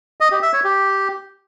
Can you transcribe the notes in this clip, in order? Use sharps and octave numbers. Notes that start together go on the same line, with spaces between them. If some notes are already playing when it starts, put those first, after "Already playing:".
D#5
G4
E5
C#5
G4